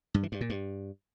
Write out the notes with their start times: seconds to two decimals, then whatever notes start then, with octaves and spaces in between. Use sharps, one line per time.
0.14 G2
0.23 E3
0.32 G2
0.41 A#2
0.50 G2